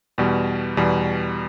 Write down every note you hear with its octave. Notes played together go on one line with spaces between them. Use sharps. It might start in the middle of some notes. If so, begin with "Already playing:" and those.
E2 B2 G3
E2 B2 G3